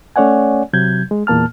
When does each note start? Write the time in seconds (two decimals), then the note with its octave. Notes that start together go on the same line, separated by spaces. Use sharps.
0.16 A3 C#4 C#5 D5 F#5 G#5
0.73 C3 F#3 G6 G#6
1.11 G#3
1.27 E2 A#2 A#3 A5 F6